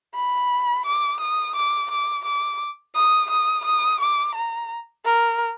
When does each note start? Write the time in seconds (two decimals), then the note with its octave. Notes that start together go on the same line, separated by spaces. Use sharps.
0.15 B5
0.86 D6
1.20 D#6
1.55 D6
1.91 D6
2.25 D6
2.95 D#6
3.30 D#6
3.65 D#6
4.00 D6
4.35 A#5
5.05 A#4